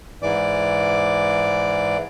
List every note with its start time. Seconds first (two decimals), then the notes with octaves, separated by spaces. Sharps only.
0.23 G#2 E3 D5 D6